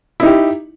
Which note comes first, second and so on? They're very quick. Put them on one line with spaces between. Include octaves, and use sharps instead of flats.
E4 D#4 G4